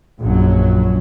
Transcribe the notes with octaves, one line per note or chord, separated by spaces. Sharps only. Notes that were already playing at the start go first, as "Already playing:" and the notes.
A#1 F#2 F#3